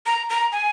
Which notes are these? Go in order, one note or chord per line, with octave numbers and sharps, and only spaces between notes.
A#5
A#5
G#5